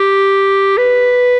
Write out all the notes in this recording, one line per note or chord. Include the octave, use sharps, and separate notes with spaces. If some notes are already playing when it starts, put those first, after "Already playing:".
Already playing: G4
B4